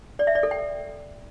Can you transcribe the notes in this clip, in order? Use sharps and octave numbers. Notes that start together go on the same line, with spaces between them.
D5
E5
D5
A4
G5